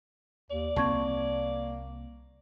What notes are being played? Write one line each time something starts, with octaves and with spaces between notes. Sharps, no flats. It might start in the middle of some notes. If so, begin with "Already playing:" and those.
D#2 D5
C2 A#3 C4 A5 C#6 G#6